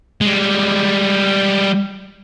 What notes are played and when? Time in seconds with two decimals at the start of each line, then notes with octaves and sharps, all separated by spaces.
0.21 G3 G#3